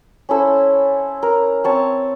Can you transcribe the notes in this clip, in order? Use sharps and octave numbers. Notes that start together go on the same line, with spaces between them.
C#4 E4 A4 C5
A#4
C4 C#5 A5